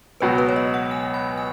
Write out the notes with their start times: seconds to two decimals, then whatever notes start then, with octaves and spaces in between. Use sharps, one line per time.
0.20 C#2 B2 F#3 B3 F#4 B4
0.38 B4
0.49 C#5
0.56 D#5
0.74 F#5
0.91 G#5
1.14 B5
1.38 G#5